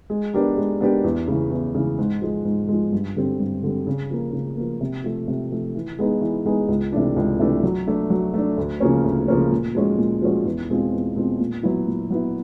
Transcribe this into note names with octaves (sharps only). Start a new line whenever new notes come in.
G#3
B3 D4 G4 A#4
G#3
B3 D4 G4 A#4
E2
C#3 E3
E2
C#3 E3
G#2
F3 G#3
G#2
F3 G#3
G2
D3 G3 C4
G2
D3 G3 C4
C#3
F3 A#3
C#3
F3 A#3
C3
F3 A3
C3
F3 A3
E3
G#3 B3 D#4 G#4
E3
G#3 B3 D#4 G#4
C#2
C3 E3 A3 D4
C#2
C3 E3 A3 D4
F#3
A3 D4
F#3
A3 D4
D2
C#3 F3 A#3 C#4
D2
C#3 F3 A#3 C#4
A#2
F3 G#3 C#4 F#4
A#2
F3 G#3 C#4 F#4
E2
B2 G#3 C4 F4
E2
B2 G#3 C4 F4
A#2
F#3 B3 E4
A#2
F#3 B3 E4